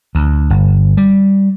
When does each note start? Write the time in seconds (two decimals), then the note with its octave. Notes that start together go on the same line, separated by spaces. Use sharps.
0.15 D2
0.50 G1
0.97 G3